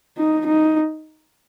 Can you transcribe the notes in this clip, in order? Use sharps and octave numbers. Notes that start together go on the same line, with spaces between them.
D#4
D#4